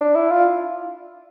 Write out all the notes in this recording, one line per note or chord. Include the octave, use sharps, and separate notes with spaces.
D4
E4
F4